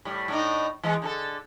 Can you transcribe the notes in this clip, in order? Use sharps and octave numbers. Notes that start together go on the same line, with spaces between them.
A2 G3
A2 D4 D#4
E3 G#3
D3 D#4 A4